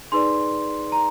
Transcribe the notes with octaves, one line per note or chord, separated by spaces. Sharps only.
D#4 G#4 B4 D5 C6
A#5